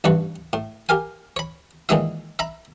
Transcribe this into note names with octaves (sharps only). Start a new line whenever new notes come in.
A1 G2 E3 B4 C#6
A2
G4 A#4 F5 G#5
C#5 B5
A#2 D#3 E3 G#3 D#4 E5
E5 A#5 B5